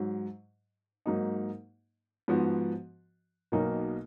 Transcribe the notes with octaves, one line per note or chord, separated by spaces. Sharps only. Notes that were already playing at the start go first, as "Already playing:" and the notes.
Already playing: G#2 F#3
G#2 F#3 A#3 D#4
G#2 F3 B3 F#4
B1 B2 A#3 D#4 A#4